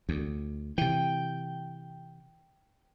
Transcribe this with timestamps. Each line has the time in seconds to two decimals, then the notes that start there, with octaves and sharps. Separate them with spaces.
0.09 D2
0.78 C3 E3 G5